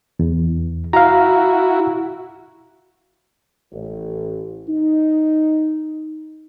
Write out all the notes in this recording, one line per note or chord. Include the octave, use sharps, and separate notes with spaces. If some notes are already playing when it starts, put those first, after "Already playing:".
E2
E4 F#4 F5 A#5
A1
D#4